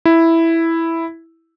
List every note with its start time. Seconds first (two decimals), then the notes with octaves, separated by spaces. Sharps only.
0.05 E4